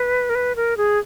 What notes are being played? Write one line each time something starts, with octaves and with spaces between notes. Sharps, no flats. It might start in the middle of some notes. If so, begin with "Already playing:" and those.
Already playing: B4
A#4
B4
A#4
G#4